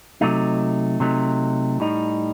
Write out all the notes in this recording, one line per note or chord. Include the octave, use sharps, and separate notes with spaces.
C3 F#3 A3 D#4
C3 F#3 A3 D#4
A2 G3 D#4